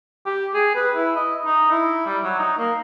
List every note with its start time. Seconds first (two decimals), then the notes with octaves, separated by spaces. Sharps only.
0.26 G4
0.55 G#4
0.75 B4
0.95 E4
1.16 D#5
1.46 D#4
1.71 E4
2.06 G3
2.23 F#3
2.39 D#4
2.58 A#3